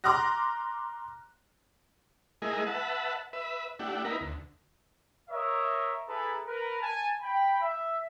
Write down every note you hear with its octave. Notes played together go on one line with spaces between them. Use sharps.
A#5 C6 D6 F6 F#6 A#6
G#3 A3 E4 G#4 A#4 D#5
B4 E5 F#5 A5
B4 E5
A3 D4 E4 G4 F#5
A#3 D#4 E4 A#4 B4
D2
A#4 C#5 D#5 E5
E4 G#4 A4 B4 A5 A#5
A#4 B4
G#5 A5
G5 B5
E5